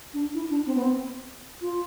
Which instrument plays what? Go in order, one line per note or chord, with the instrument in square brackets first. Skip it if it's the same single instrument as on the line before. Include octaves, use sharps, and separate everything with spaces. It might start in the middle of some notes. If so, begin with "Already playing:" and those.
[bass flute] D4
E4
D4
C4
B3
C4
F4